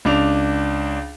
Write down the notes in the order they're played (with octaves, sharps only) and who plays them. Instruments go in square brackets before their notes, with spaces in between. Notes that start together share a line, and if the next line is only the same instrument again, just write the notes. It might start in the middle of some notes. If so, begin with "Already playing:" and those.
[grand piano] C#2 D4 F7